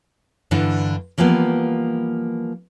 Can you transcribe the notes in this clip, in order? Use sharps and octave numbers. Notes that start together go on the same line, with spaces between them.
G2 D3 E3 D4 A4
E3 F3 G3 A#3 B3